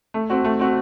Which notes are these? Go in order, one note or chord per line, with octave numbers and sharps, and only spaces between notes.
A3
C4 F#4
A3
C4 F#4